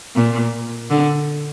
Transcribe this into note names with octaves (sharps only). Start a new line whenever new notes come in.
A#2
D3